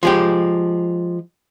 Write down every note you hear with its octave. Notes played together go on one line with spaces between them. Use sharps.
F3 G#3 G4